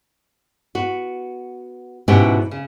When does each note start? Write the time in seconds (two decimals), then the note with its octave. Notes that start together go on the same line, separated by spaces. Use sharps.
0.75 B3 F#4
2.08 G#2 B2 E3 C#4 F#4 G4
2.51 C#3